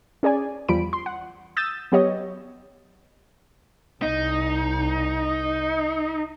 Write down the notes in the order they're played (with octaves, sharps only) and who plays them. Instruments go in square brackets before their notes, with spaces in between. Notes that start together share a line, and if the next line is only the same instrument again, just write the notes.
[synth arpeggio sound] C#4 G#4 D5 G#5
E2 F3 G3 B5 D7
C6
F#5
D#6 E6 G6 A6 E7
F#3 B3 G4 C#5 D#5
[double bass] C2 [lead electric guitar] D#4